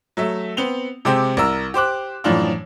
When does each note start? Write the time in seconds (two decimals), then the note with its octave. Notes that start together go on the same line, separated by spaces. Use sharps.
0.17 F#3 A3 E5
0.57 B3 C4 F7 G7
1.05 C3 G#3 C4 G4
1.37 C2 A#4 E6
1.74 G4 C5 D6 F#6
2.24 F#2 A2 E3 F3 D4 F4